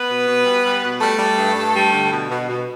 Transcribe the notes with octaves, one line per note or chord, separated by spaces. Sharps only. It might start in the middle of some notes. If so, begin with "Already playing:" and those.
Already playing: B3 B4
B2
B2
G3
G3
B2
G3 A3 A4
G3
G2
G2
G3
D3
B2
B2
B2